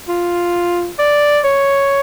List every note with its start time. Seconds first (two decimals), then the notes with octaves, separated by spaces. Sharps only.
0.08 F4
0.99 D5
1.44 C#5